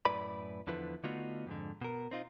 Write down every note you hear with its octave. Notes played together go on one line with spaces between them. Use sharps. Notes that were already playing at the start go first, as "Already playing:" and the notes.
F#2 A2 E4 B4 D5 B5
E2 D3 F3 E4 B4
D3 A3 B3 D#4 F4 F#4
F2 G#2 D3
B2 A#4
C4 D#4 F4